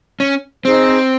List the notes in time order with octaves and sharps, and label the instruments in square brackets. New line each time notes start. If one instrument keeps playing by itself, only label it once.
[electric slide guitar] C#4
[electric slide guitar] C4 [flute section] D#4 G#4 C5